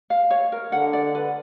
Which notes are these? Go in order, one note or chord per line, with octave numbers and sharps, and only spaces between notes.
F5
C#5
A#4
D3 F#5
D5
B4